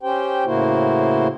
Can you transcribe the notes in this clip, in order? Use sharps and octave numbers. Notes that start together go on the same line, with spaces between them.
C#4 G4 C5 G5
A2 C#3 A#3 E4 F#4 C5